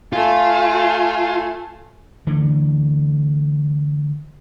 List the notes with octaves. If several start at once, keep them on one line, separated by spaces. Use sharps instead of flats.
A3 F4 G#5
D3 E3 A3